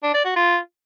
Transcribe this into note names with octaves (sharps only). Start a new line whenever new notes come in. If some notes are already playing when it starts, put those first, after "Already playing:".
D4
D5
F#4
F4